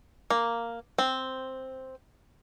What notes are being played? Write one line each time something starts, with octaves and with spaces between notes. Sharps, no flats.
A#3
C4